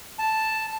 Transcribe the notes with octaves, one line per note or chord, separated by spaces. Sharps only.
A5